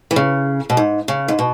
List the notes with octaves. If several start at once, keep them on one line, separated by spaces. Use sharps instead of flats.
E3
C#3
B2
G#2
C#3
G#2
B2